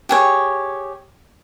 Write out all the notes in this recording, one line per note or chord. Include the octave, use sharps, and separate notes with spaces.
G4 G#4 C#5